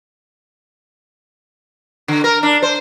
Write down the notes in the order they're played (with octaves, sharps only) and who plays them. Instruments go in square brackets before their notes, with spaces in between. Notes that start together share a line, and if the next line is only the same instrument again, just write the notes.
[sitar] D3
A#4
D4
C5